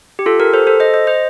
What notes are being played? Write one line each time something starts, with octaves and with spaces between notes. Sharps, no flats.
G4
F4 A4
G4 A#4
A4 C5
A4 C5
C5 D#5
C5 D#5
C5 D#5